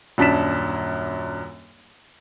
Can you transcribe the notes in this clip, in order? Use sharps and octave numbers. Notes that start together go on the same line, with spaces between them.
D#1 F#2 D4 A5 B6 E7